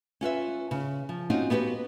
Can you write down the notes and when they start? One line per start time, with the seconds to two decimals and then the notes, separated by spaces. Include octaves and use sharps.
0.21 C#4 F4 B4 E5
0.71 C#3
1.09 F3
1.30 C4 C#4 D#4 F4 F#4
1.50 B3 E4 F#4 G4 B4